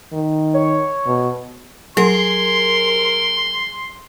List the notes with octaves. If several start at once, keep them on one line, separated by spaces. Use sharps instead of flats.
D#3
C#5
B2
F#3 G#4 A#4 C6